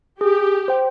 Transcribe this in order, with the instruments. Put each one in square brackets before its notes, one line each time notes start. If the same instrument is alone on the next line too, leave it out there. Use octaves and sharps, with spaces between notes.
[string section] G4 [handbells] G#4
[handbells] C5 G5